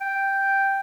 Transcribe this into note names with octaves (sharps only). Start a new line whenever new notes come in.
G5